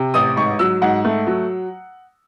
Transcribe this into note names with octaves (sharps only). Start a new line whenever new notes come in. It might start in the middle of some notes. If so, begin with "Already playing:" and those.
Already playing: C3
A1 D#6
G#2 C#6
F#3 E6
G#2 F#5
A3
F#3